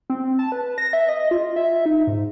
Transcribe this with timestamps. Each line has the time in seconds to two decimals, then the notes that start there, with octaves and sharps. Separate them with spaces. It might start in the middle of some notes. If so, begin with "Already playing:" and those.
0.10 C4
0.39 A5
0.52 B4
0.78 A#6
0.93 E5
1.08 D#5
1.31 F4
1.56 E5
1.86 D#4
2.07 G#2